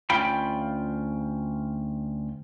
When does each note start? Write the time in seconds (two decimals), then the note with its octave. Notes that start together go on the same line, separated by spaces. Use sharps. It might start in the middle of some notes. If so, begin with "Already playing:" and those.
0.10 D2 C#4 F4 G5 B5